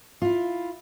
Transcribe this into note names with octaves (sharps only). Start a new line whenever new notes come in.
E4 F4